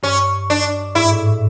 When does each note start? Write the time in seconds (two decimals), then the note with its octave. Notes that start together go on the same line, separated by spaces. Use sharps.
0.03 G2 C#4
0.50 D4
0.95 G#2 E4
1.11 A2
1.26 A2